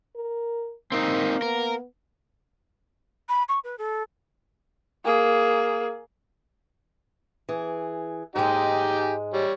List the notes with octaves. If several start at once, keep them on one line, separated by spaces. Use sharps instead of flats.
A#4
D#3 A#3 C4 D#4
B3 A#4
B5
C#6
B4
A4
A#3 G#4
E3 G#4
G#2 G#3 D#4 G4 G5
G3 C#5